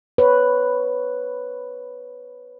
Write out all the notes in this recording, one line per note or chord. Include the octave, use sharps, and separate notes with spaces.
B4 C#5